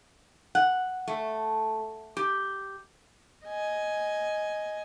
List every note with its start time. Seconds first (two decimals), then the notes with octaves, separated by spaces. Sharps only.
0.55 F#5
1.08 A3
2.17 G4
3.46 D#5 G#5